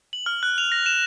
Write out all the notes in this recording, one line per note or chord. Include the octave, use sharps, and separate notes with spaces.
F#7
F6
F#6
F7
A#6
E7